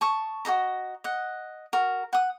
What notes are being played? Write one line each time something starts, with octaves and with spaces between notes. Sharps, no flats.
A5 C#6 D#6
F#4 A4 D#5 A#5
D#5 F#5
F#4 A#4
F#5 D#6